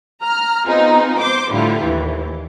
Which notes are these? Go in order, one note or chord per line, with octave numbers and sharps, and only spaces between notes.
A#5 F6
B3 C4 D#4 F4 G#4
C5 C6 D6 G6
A2 D3 G3 E4 F4
D#2 E3